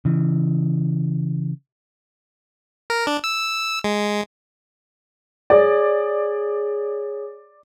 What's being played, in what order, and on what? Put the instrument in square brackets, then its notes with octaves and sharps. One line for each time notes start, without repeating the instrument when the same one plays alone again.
[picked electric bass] C#3 E3
[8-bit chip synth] A#4
D4
E6
G#3
[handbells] G#4 C#5 [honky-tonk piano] D5